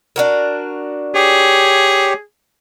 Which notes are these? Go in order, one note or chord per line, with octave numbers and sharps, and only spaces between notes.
D4 F#4 A#4
G4 G#4 C#5